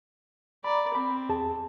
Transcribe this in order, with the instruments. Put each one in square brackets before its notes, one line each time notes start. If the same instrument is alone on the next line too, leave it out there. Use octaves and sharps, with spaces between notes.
[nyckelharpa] D5 [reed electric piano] A#5 B5
[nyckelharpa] C4 [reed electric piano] B5
[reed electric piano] E2 G#4 A5